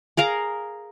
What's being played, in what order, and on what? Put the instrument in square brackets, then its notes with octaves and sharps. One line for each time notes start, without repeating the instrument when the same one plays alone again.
[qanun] G#4 A#4 F5 A#5